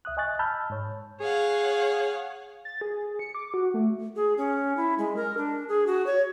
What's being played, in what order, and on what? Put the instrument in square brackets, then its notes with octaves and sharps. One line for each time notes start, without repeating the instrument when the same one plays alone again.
[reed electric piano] C2 E5 D#6 F#6
D#5 G#5 C#6 F#6 A6
A5 B5 E6 F6 G6
G#2 C#5
[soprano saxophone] G#4 [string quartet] C#5 F5 F#5
[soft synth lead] A6
G#4
C#7
D6
F#4
A3
[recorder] G#4
C#4
E4
G#3
A#4
D4
G#4
F#4
C#5